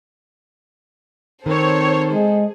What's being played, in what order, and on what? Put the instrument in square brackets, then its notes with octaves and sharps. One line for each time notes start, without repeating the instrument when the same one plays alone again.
[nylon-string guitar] D#3 [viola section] C4 C#5 [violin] A4 C5
[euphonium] G#3 [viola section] G#4